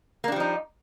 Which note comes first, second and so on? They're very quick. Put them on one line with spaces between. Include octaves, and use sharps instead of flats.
A#3 D4 G3 F3 D#4